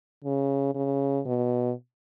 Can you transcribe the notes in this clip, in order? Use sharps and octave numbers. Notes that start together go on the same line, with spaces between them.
C#3
C#3
B2